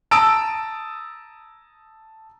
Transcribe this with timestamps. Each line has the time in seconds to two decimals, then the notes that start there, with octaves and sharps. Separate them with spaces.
0.11 A5 A#5 D#6 E6 D7